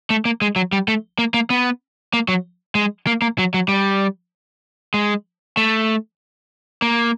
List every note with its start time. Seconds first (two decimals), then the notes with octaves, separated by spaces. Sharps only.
0.10 A3
0.25 A#3
0.42 G#3
0.56 F#3
0.72 G3
0.88 A3
1.18 A#3
1.34 A#3
1.50 B3
2.13 A#3
2.28 F#3
2.75 G#3
3.07 A#3
3.22 A#3
3.38 F#3
3.54 F#3
3.69 G3
4.94 G#3
5.57 A3
6.82 A#3